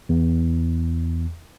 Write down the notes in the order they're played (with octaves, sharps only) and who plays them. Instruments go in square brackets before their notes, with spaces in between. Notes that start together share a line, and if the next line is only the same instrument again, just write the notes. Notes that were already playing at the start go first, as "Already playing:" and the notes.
[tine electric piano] E2